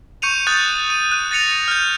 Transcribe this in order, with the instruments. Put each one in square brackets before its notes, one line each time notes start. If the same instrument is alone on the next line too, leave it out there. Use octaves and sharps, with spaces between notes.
[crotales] C#6 G6 C#7 D#7 F7
D#6 F#6 G6 A6 D#7
D#7
F#6 D#7
A6 A#6 C#7 F7
F6 G6